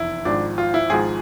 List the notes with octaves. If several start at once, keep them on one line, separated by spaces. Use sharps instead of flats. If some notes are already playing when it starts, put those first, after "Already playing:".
Already playing: F1 E2 E4
G#1 G#2 F3 D4
F4
E4
G#1 G#2 F3 G#4